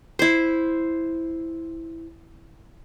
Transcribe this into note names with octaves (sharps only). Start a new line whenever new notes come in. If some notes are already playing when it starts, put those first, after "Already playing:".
E4 C5